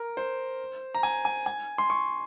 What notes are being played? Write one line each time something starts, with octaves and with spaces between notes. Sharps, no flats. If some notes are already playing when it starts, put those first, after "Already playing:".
Already playing: A#4
C5
A#5
G#5
G#5
G#5
C6
C#6